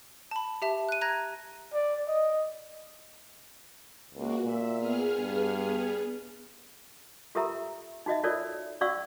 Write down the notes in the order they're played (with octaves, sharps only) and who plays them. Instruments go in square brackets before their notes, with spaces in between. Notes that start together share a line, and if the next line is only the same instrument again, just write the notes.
[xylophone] A5 B5
G4 E5 A5
F#6 D#7
A#5 F#6 G#6 A#6
[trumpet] D5
D#5
[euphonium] C#2 [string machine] A#3 F#4
[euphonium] A#2 [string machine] E5
[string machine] B3 G#4 F6
[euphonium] G2
[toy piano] F4 G4 A4 A#4 E5 A#5
D#4 F#4 D#5 E5
F4 F#4 A4 A#4 C#5 D5
C#4 F#4 D5 F5 C#6 E6